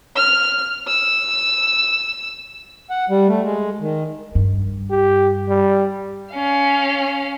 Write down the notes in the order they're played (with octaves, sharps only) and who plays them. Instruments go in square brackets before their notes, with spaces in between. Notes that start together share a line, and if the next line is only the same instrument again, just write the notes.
[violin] F6
E6
[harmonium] F#5
G3
A3
G#3
D#3
[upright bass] G2
[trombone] G4
G3
[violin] C#4 F5